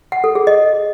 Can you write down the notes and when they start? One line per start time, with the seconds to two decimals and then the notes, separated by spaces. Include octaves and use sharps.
0.12 F#5
0.24 A4
0.35 G#4
0.47 D#5